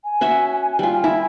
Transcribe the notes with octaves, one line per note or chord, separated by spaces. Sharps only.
G#5
C#4 F#4 E5
G3 F4
E4